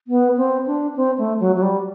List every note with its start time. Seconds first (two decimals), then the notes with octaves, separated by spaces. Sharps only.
0.08 B3
0.37 C4
0.66 D4
0.96 C4
1.18 A3
1.40 F#3
1.56 F#3
1.62 G3